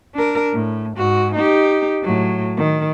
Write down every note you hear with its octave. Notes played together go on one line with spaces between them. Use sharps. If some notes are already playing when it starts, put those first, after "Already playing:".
D4 A#4
A2
G#2 F#4
D#4 G4
A2 F#3
D#3